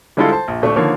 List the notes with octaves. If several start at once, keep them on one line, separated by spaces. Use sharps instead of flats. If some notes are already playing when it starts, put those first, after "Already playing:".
D3 G3 G#3 E4 F4 A4
C5 A5
A#1
D#1 A3 D4 C#6
D3 D#3 F3 A#3 C#5